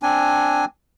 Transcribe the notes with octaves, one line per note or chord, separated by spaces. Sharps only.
C4 D4 G#5